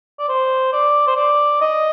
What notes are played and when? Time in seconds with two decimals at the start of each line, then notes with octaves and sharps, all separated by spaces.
0.19 D5
0.29 C5
0.73 D5
1.07 C5
1.16 D5
1.61 D#5